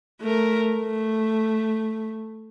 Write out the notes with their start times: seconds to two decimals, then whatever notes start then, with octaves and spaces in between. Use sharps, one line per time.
0.21 A3 A#4
0.77 A3